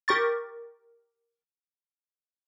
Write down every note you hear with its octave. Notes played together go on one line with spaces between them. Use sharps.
G4 A#4 C#6 A6